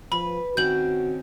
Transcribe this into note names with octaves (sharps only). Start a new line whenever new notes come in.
F3 B4 B5
D#3 C4 C#4 F#4 G6 F#7